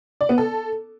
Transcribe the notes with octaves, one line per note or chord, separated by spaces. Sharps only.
D5
B3
A4